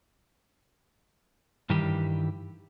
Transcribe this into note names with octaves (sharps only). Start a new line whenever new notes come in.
G2 D#3 E3 G3 G4